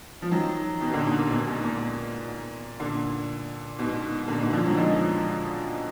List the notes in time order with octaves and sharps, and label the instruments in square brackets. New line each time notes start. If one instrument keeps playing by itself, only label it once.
[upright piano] F3
D#3 F#3
B2 D#3
A#2 D3
A#2
A#2
G#2 B2
A#2
A#2
A#2 D3
G#2 B2
A#2 D3
G#2 B2
D3 F3
D#3 F#3
F3 G#3